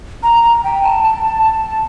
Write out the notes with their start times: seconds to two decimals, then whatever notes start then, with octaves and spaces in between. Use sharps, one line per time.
0.23 A#5
0.43 A#5
0.64 G5
0.83 A5
1.03 A5
1.43 A5